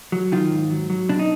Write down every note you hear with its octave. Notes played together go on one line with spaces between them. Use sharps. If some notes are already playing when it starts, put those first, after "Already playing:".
F#3
D#3 F4
G#2
F#3
F#3
B2 D4
D#4